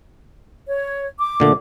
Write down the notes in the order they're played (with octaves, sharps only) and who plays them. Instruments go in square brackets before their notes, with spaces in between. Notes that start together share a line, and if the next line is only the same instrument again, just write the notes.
[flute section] C#5
D6
[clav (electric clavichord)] A#2 D3 A3